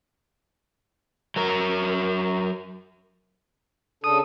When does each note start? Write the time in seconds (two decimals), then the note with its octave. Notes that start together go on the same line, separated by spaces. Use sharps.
1.36 F#3 A#4
4.04 C#3 D4 A4 D#6